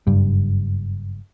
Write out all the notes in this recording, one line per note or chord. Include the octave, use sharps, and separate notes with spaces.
F#1 G2 G3